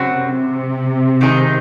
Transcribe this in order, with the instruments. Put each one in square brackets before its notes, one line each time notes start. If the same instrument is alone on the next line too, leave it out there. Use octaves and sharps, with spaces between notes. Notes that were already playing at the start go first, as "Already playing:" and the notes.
Already playing: [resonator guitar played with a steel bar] F#2 C#3 F#3 C4 F#4
[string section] C3
[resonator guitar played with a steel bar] D#3 G#3 D#4 G#4